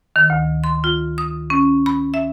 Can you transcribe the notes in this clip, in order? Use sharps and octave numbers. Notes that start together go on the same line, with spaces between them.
D#3
D2
C6
F4
D#6
C#4
B5
E5